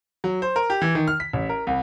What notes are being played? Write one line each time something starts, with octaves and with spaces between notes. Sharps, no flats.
F#3
C5
A#4
G4
E3
D#3
F6
B6
A1
A#4
C2